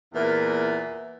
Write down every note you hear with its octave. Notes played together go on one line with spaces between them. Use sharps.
E2 A#2 E3